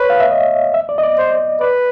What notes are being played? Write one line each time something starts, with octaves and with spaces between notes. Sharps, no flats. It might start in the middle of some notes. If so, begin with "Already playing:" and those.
Already playing: B4 C#5
F5
E5
D#5
E5
D5
D#5
D5
C5
B4 D5